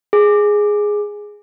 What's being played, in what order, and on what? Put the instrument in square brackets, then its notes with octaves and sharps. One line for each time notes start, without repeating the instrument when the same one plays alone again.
[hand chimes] G#4